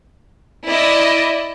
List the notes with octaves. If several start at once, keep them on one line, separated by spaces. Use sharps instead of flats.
E4 D5 D#5